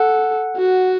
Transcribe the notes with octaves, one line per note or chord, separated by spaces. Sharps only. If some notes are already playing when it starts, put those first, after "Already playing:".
Already playing: A4 F#5
F#4